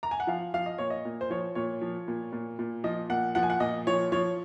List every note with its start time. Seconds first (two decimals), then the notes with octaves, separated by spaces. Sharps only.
0.03 A#5
0.11 G#5
0.20 F#5
0.27 F3 F5
0.54 F3 F5
0.66 D#5
0.78 A#2 C#5
0.90 D#5
1.05 A#2
1.21 C5
1.30 F3 C#5
1.55 A#2 C#5
1.81 F3
2.08 A#2
2.32 A#2
2.59 A#2
2.84 F3 D#5
3.10 A#2 F#5
3.35 F3 F#5
3.43 G#5
3.50 F#5
3.60 A#2 D#5
3.87 F3 C#5
4.12 F3 C#5